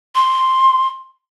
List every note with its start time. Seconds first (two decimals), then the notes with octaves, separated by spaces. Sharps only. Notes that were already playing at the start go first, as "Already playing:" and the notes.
0.15 C6